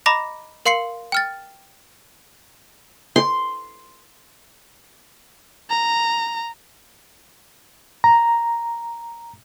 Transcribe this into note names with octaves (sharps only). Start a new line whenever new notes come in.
D#5 A#5 B5 D6 A#6
A#4 F5 C6 C7 C#7 F#7
G5 F6 A6
C6
A#5
A#5